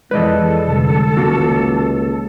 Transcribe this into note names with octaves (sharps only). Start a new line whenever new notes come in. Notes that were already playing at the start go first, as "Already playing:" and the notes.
F2 E3 G#3 A4 B4 D5 D#5
F1 D3 G3
C#2 D#3 A#3 F#4